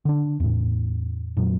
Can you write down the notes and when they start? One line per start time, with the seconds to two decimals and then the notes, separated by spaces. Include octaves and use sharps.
0.05 D3 D4
0.40 E2 A2
1.37 F2 A#2 F#3